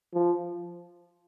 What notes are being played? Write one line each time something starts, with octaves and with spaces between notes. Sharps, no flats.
F3